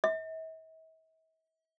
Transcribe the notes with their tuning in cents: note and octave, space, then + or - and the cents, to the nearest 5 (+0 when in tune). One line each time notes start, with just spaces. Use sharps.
E5 -45